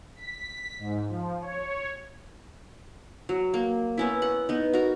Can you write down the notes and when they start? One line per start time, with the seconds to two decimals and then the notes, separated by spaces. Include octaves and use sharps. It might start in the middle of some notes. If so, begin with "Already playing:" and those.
0.16 B6
0.79 G#2
1.09 F3
1.41 C#5
3.29 F#3
3.54 A#3
3.98 B3 C#4 E4
4.22 F#5
4.49 B3 D#4
4.73 F#4 A#4